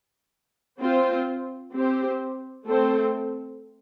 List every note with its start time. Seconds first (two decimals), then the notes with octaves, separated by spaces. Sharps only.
0.80 C4 F4 C5
1.72 C4 G4 C5
2.65 A3 C4 A4 C5